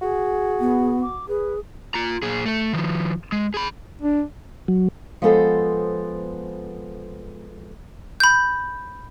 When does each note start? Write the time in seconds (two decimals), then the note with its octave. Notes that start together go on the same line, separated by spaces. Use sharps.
0.01 F#4 G#4
0.60 B3
1.02 D6
1.28 G#4 B4
1.94 F4 A#5
2.22 A#2 G#4
2.46 A3 A4
2.73 D#3 F3
3.32 G#3
3.54 G#4 B5
4.02 D4
4.68 F#3
5.22 F3 G#3 B3 A4 C5
8.20 B5 G6